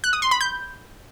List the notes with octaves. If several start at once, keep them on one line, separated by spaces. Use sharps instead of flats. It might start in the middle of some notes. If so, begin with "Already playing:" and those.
F#6
D#6
C6
B5
G6